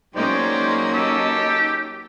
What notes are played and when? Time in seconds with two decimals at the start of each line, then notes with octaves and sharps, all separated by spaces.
0.16 F#3 G#3 A#3 C#4 D#4 C5 D5 G5
0.94 G4 A5 E6